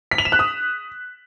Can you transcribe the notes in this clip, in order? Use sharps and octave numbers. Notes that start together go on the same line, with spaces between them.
B6
F7
E7
F#6
D#6